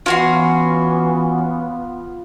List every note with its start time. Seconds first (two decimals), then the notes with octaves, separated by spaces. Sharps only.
0.06 E3 B3 C#4 F4 F#4 C6